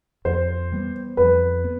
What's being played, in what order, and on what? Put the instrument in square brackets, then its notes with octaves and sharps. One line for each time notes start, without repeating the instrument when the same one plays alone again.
[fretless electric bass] F2 [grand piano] C5
[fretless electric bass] E3 G3 B3
[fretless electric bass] F2 [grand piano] B4
[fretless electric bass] B3